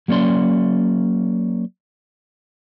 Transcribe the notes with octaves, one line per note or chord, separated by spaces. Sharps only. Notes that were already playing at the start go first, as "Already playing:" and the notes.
F#3 A#3 C#4 D5 C6